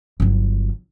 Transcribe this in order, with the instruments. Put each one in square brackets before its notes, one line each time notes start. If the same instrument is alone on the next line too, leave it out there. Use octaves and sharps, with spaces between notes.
[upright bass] G1 F#3